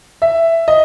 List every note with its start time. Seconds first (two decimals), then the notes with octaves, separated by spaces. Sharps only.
0.22 E5
0.68 D#5